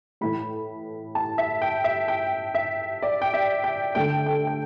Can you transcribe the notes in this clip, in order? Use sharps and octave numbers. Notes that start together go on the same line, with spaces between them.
A2 E3 A3 B5
A5
E5
G5
E5
G5
E5
D5
G5
E5
G5
D3 A3 G5
G5
G5